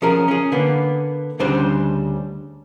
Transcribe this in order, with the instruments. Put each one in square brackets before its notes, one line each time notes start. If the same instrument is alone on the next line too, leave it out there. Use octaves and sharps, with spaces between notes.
[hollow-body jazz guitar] F3 C#4 G#4 A#4
C#4 G#4
D3 A#3 B3
D2 C#3 G3 C#4 D4 C5